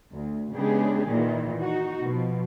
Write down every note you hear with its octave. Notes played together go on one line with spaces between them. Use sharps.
D2
C#3 G#3 B3 D4 G4 G#4
A#2 D#3 E3 A#3
D#4 F#4
B2 F3